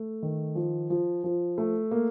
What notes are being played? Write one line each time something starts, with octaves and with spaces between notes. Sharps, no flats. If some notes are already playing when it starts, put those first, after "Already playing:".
Already playing: A3
D#3
F3
F3
F3
A3
A#3